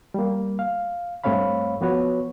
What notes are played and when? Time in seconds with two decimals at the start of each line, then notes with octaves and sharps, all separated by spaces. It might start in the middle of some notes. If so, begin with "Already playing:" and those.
0.14 G3 A#3
0.59 F5
1.24 G2 A3 C4 C#5 F5 B5
1.81 F3 B3 F#4 B4 C#5